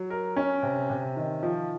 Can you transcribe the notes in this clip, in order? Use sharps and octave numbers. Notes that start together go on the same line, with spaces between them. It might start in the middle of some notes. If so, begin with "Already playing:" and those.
Already playing: F#3
A#4
C#4
C3
C3
D#3
F3